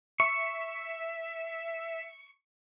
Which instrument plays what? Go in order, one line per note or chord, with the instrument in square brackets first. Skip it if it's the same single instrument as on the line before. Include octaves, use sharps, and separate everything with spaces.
[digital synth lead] E5 [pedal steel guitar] C#6